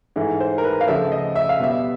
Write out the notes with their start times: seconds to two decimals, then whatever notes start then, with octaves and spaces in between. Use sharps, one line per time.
0.16 G#2 E3 A3
0.40 C5
0.58 A#4
0.64 B4
0.81 F5
0.88 D2 C#3 F3 A3 E5
1.12 D#5
1.36 E5
1.49 F5
1.59 B2 G3 B3 E5